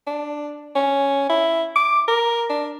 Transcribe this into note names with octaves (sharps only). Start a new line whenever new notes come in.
D4
C#4
E4
D6
A#4
D4